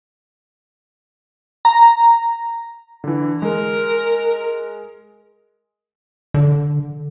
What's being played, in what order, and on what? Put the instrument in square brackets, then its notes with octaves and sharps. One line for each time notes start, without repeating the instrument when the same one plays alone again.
[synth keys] A#5
[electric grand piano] D3 E3
[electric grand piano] G#3 [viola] A#4
[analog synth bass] D3